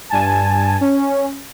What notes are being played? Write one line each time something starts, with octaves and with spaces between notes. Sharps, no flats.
G2 G#5 A5
C#4